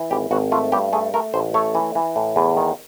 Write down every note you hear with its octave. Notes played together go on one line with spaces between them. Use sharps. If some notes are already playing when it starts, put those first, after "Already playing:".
Already playing: E3
G#1 G4
G#1 F#4
A3 F4
G2 G4
A3 G#4
A3 A#4
A1 C5
A3 C#5
E3
E3
A2
E2
D#3